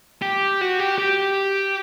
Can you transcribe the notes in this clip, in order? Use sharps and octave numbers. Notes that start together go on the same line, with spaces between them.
G4
F#4
G4
G4